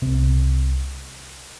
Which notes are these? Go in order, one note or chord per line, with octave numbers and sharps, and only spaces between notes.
C2 C3 C4